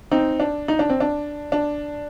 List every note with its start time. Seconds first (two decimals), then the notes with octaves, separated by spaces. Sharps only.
0.12 C4 D#4
0.40 D4
0.68 D#4
0.79 D4
0.90 C4
1.00 D4
1.52 D4